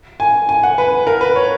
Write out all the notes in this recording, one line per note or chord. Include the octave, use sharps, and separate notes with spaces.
G#5
G#5
F#5
B4
A#4
B4
C#5